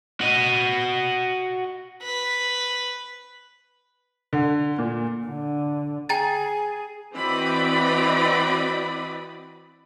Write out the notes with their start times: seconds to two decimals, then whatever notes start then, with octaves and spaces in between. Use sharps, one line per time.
0.21 F#4 D#5
2.02 B4
4.33 D3
4.78 A#2
5.26 D3
6.09 G#4 G5 A#5 A6
7.15 E3 C4 F#4 D5 D#5 B5